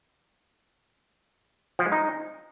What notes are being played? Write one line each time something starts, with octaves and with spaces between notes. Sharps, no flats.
F3
G#3
D#4